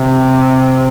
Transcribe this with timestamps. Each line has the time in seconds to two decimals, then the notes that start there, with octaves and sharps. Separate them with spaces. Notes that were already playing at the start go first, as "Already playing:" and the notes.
Already playing: C3